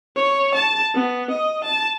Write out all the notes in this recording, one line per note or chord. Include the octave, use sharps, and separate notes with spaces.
C#5
A5
B3
D#5
A5